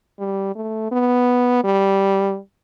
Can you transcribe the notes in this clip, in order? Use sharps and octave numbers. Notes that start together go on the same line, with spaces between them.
G3
A3
B3
G3